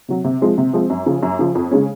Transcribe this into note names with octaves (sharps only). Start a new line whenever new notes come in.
C3 F#3
C3
F3 G#3 C4
C3
F3 G#3 C4
F#2
C#3 F3
F#2
C#3 F3
F2
C#3 G#3 C#4